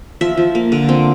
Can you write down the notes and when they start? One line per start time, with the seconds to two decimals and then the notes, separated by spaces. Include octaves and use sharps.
0.21 F3 E5
0.37 F3
0.55 A#3
0.72 D3
0.89 C4